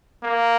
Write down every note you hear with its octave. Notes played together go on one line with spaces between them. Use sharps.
A#3